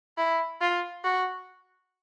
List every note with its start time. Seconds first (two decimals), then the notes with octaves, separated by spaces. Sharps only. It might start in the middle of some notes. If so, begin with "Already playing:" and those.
0.18 E4
0.61 F4
1.04 F#4